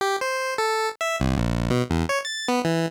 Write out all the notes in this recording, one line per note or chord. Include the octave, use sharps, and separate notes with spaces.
G4
C5
A4
E5
C2
A#1
B2
E2
C#5
A6
B3
E3